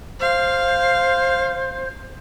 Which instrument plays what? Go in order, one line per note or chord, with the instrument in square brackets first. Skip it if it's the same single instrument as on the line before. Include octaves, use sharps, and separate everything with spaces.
[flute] C5 [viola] F5